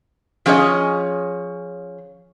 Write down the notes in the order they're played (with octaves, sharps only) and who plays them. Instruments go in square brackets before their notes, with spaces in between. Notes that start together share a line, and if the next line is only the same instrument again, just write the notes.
[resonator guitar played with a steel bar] F3 C#4 G#4 C#5 D#5